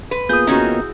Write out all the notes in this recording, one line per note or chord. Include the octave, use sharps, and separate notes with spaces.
B4
A#3 B3 F4 G#4 D#6 G6
D#3 C#4 D#4 E4 F#4